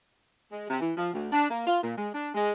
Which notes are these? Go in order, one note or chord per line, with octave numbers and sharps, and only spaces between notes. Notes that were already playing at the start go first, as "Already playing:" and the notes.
G#3
C3
E3
F3
D2
D4
A#3
F4
A#2
G#3
D4
G#3